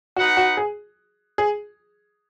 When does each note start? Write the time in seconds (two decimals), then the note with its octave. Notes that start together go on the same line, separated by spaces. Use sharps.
0.16 D#4 F#4 B4 F#5
0.37 F#4
0.57 G#4
1.38 G#4